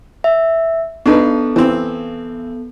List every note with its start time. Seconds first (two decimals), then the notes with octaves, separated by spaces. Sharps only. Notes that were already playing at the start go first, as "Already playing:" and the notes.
0.24 E5
1.06 B3 D4 D#4 A4 B4
1.56 E3 C4